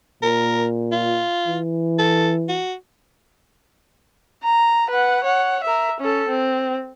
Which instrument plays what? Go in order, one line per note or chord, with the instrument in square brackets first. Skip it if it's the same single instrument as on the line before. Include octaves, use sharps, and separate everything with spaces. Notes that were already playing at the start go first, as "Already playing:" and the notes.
[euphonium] A#2 [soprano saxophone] A#4
[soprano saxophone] F4
[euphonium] E3
[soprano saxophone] A4
F#4
[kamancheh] A#5
B4 F#5
C#5 F#5
A#4 E5
C#4 A4
C4